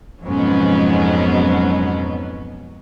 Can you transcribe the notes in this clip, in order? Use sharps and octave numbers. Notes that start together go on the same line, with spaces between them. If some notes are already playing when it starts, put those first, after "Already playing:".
F2 G#2 B2 F#3 B3 C#4